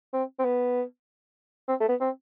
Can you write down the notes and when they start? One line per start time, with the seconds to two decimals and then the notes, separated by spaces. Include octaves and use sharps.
0.14 C4
0.39 C4
0.45 B3
1.68 C4
1.80 A3
1.89 B3
2.00 C4